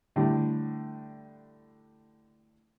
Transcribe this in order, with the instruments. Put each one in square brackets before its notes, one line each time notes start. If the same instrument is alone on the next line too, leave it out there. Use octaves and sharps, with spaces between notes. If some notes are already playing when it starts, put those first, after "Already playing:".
[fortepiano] A2 D3 G3